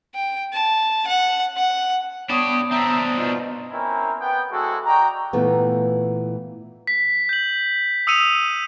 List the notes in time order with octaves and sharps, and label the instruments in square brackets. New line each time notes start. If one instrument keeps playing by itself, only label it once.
[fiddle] G5
A5
F#5
F#5
[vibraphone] B3 D#6 [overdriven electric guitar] D4 G4 [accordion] C#5
[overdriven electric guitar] C4 D4 [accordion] E5 A#5
[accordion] B2 D#4 F4
[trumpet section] C4 C#4 E4 A#4
B3 G5
G#3 C4 E4 F#4 A4
F#4 D5 D#5 G5 A#5
[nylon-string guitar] A#2 E3 A3 B3
[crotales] B6
G6 F#7
D#6 E6 C#7 D#7 F7